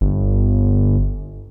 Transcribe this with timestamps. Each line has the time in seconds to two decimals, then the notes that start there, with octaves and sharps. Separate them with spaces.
0.01 G1